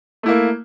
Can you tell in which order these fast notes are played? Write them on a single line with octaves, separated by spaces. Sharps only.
A3 E4 A#3